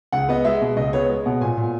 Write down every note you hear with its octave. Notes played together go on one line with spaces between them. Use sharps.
C#2 F#5
B3 D#5
G#3 E5
B2
C#2 D#5
B3 C#5
G#3
B2 F#5
A#2 G#5
A#2